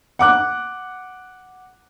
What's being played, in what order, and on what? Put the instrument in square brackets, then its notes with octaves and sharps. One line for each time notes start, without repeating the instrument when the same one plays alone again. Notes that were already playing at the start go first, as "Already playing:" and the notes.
[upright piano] F#5 D6 F#6